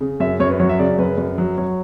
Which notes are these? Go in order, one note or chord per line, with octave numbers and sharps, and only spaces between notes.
C#3
F#2 E5
F#2 C#5
B4
F#3 C#5
E5
C#3 D5
F#2 B4
F#2
F#3
F#3 C#5